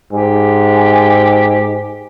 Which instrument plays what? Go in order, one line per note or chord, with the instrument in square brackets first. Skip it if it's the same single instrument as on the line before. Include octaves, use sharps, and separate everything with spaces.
[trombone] G#2 [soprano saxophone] G4 [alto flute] G#5